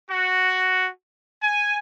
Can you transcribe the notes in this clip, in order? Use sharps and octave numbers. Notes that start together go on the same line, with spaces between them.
F#4
G#5